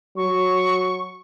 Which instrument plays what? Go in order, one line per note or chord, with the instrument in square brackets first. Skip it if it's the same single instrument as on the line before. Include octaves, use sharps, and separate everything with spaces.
[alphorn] F#3 [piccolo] C#6